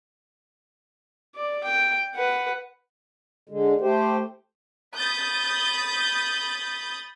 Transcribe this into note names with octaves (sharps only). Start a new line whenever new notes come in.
D5
G5
B4 F#5
D3 G#3
A3 G4 C5
B5 D#6 G6 A6